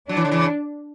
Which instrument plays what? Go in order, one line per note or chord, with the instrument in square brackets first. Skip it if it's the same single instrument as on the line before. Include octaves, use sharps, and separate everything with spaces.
[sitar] F#3 [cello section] D4
[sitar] E3
D3
C#3 E3